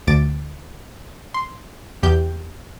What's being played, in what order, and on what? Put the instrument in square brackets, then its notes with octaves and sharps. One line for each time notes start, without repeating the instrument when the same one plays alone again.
[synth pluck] D2 D6 A6 D7
C6
E2 G4 G6